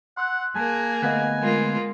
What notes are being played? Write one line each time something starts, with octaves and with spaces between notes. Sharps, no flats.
F#5 C6 E6 F#6
A#3 G#4 A#4 G#5 A5 F#6
D2 B3 D#5 F5 F#6
G#3 A#3 F4